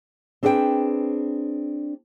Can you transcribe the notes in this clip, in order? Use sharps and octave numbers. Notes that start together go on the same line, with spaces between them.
C4 D4 G#4 B4 D5 G5